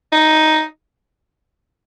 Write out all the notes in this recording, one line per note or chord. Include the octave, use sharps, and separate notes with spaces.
D#4